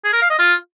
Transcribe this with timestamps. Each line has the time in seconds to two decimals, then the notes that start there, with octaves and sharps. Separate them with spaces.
0.05 G#4
0.13 A#4
0.22 F5
0.30 D#5
0.39 F4